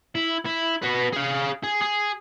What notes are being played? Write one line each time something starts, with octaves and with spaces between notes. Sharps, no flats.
E4
E4
F#4 B4
G#4 F5
G#4
G#4